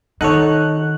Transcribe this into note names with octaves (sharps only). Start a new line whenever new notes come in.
D#3 D#4 A4 C#5 F#5 F#6